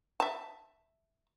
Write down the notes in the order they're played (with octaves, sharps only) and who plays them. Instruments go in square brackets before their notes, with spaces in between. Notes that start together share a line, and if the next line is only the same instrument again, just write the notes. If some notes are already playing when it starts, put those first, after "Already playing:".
[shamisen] E5 A5